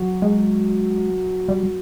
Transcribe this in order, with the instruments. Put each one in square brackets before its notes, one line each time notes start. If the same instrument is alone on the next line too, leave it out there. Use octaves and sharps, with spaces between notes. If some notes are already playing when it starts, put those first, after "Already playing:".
Already playing: [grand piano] F#3
[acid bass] G#3
G3